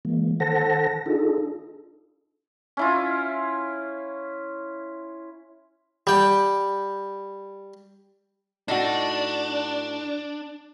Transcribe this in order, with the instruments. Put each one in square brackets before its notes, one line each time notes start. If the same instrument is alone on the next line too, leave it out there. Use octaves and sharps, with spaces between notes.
[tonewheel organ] E3 G#3 A#3
D#3 A4 C5 F#5 A5 A#6
D4 D#4 F4 G#4 A4
[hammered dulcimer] C#4 E4 F4
[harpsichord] G3 G5
[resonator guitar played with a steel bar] A2 D#4 F#4 [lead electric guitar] D4